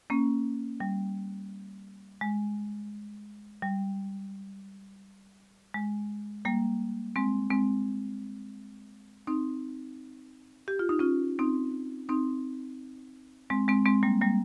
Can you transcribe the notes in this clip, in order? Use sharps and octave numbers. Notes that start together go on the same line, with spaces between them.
A#3 C#4
G3
G#3
G3
G#3
G3 A#3
G#3 C4
G#3 C4
C4 D#4
G4
F4
D#4
C#4 F4
C4 D#4
C4 D#4
G#3 C4
G#3 C4
G#3 C4
G3 A#3
G3 A#3